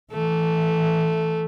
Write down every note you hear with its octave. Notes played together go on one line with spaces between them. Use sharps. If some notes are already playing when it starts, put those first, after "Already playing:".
E3 A3